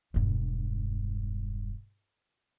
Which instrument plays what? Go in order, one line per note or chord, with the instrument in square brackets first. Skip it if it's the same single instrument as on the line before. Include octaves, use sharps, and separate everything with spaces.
[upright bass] E1 G2